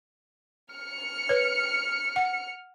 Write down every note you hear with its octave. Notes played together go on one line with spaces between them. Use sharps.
F6 C#7
B4 C#5
F#5